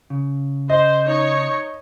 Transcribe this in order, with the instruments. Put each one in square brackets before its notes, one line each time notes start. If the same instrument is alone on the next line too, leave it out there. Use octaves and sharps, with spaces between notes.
[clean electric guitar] C#3
[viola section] C5 [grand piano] D#5
[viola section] D#4 C#5